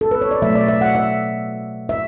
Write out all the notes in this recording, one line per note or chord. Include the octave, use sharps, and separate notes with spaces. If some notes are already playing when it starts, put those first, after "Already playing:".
A4
B4
C#5
D5
B2 F#3 A3 E5
D5
E5
F#5
E5
E5